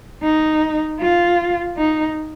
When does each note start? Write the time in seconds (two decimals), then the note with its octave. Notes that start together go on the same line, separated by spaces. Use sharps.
0.23 D#4
1.00 F4
1.77 D#4